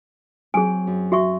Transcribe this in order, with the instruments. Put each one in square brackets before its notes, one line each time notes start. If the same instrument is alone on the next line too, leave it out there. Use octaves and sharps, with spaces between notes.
[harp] F#3 C4 [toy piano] G#4 G#5
[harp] F#2
[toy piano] F#4 E5 C#6